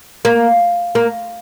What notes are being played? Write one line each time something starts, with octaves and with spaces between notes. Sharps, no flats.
A#3
A#3